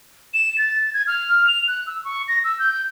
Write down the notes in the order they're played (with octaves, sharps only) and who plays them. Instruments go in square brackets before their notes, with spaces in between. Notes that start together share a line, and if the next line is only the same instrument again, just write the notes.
[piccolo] E7
A6
G#6
F6
F7
F#6
E6
C#6
A#6
E6
G6